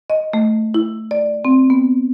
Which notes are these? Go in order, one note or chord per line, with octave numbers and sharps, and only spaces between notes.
D#5
A3
E4
D5
C4
B3